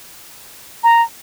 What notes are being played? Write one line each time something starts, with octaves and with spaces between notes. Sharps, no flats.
A#5